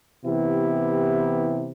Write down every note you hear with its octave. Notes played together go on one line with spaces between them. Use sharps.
C3 E3 B3 E4 G4